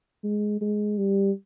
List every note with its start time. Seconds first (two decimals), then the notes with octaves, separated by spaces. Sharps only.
0.24 G#3
0.61 G#3
0.98 G3